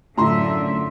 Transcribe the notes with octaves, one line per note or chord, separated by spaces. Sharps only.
F#2 A2 D3 F4 E5 A#5 C6